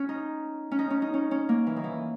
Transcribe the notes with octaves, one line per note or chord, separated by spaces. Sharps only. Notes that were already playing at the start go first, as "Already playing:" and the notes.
Already playing: C#4
D#4
C#4
D#4
C#4
D#4
C#4
C#4
A#3
E3
D#3
E3